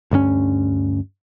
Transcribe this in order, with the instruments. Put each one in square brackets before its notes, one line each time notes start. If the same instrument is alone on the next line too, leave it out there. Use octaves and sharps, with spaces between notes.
[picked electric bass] D2 G2 G3 C#4